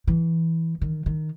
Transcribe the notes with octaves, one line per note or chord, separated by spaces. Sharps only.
E3
D#3
D#3